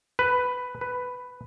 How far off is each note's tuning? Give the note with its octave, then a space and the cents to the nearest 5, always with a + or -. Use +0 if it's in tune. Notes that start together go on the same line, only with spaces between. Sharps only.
B4 +5
B4 +5